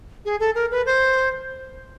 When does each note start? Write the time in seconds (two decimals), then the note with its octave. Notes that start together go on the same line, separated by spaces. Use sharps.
0.25 G#4
0.40 A4
0.55 A#4
0.71 B4
0.86 C5